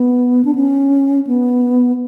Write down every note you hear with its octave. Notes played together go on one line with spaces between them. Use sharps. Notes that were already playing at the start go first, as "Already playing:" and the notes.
Already playing: B3
D4
C#4
B3